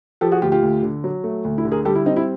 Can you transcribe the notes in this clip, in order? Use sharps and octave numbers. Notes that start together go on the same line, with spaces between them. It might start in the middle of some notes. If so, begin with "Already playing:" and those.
F3 G4 A4
F#4 G#4
D2 F4 G4
F4 G4
D2
D3
F#3
A3
D2
E4
D3
G#4 A#4
G3 G4 A4
E4
C4 D#4
E4